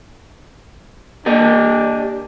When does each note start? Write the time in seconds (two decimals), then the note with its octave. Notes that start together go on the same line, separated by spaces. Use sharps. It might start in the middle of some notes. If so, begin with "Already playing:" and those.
1.26 A#3 D4 G4 D5 D#5